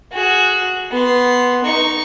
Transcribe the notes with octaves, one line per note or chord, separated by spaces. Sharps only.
F#4 G#4
B3 C6
D#4 C#6